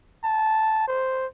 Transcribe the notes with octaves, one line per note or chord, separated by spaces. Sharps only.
A5
C5